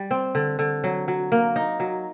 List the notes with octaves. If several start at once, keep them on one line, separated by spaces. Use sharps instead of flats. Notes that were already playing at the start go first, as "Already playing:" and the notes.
Already playing: G3
C4
D3
D3
F#3
F#3
A#3
D#4
F#3